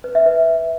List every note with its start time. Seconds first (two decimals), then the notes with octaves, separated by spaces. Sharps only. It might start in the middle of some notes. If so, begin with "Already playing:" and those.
0.04 B4
0.15 E5
0.26 B4